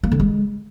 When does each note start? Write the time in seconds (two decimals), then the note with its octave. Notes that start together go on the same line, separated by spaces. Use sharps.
0.03 A#3
0.12 D3
0.20 G#3